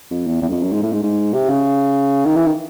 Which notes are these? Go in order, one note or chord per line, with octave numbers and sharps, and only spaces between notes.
F2
E2
E2
F#2
F2
F#2
G#2
A2
G#2
G#2
C3
C#3
D#3
E3
D#3